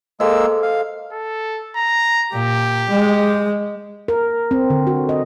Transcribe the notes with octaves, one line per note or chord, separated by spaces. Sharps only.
G#3 A#3 A4 C5 D#5 E6
F5
A4
A#5
A#2 G4
G#3
A#4
C4
D3
F#4
D#5